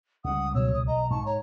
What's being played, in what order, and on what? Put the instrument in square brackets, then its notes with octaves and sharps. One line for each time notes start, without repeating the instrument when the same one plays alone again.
[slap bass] C#2 G3 [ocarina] F#5 [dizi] D#6
[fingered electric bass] B2 F#3 [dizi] C#5 [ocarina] E6
[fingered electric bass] B1 [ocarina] D#6
[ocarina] D#5 [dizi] A#5
[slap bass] G#2 [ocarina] A5 [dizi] C#6
[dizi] C#5 [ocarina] A#5